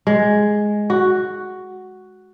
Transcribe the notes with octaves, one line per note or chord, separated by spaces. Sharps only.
G#3
F#4